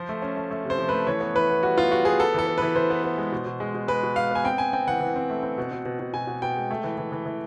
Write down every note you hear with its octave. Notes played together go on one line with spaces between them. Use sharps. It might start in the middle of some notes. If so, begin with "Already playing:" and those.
Already playing: F3 C5
A3
C#4
A3
A3
C3
C5
F3
A3 B4
E3 C#5
B3
E3 B4
B3
G3 F#4
B3 F4
G3 F#4
B3 G#4
B3 A4
E3 A4
B3
E3 B4
E3 C5
B3
B3
G#3
B2
B2
G#3
B2
G#3 B4
B2
G#3 F5
B3 G#5
C4 G5
C4 G#5
C4 G5
E3 F#5
E3
C4
A3
C4
B2
B2
B2
B2
B2 G#5
B2
B2 G5
G#3
A3
E3
E3
E3
E3